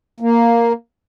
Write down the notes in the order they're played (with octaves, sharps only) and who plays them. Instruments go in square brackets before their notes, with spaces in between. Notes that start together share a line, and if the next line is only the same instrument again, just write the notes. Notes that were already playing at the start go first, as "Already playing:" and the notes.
[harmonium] A#3